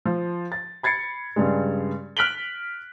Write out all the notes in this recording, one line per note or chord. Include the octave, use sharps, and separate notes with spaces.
F3
A6
B5 G#6 A6 C7 C#7
G2 C#3 G3 G#3
F6 F#6 B6 D7 F#7 G7